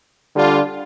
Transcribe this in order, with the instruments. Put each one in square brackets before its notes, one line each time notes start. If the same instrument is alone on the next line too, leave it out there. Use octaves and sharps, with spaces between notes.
[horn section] D3 G3 D4 F4